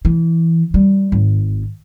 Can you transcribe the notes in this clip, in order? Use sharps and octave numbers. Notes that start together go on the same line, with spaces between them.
E3
G3
G#1